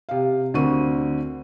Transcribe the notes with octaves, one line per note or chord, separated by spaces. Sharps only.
C3 F5
D2 D3 C4 A#4 C#6 D#7